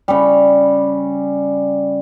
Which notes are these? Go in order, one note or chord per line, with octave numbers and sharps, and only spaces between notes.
C#3 G3